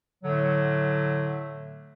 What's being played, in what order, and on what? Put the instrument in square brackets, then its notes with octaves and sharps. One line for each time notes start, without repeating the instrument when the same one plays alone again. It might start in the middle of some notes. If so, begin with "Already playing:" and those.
[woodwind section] A2 D3 F#3 A3